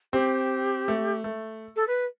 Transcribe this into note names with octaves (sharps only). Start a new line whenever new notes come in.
C4 G4
A3
A3
A4
B4